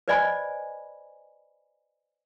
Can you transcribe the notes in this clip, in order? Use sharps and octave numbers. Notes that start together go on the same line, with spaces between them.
B4 C5 D5 D#5 G#5 B5